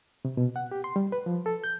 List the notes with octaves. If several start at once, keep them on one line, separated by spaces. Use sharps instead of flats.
C3
B2
F#5
G4
C6
G3
B4
F3
A4
G6